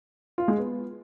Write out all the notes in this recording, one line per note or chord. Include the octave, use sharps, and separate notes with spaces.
F4
G#3
B3